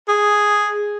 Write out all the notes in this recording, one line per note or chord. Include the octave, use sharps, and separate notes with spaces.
G#4